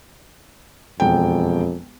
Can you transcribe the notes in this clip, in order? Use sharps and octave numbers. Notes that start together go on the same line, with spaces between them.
E1 F2 G5